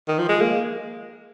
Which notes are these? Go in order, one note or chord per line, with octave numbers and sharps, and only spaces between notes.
D#3
F3
G#3
A#3